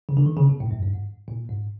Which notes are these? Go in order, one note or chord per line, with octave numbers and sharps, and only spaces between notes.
C#3
D3
D#3
C#3
B2
A2
G2
F#2
G2
G#2
A#2
G#2